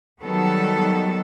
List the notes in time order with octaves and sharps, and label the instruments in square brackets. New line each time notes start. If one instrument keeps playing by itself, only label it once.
[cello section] D#3 F#3 G3 B3 A4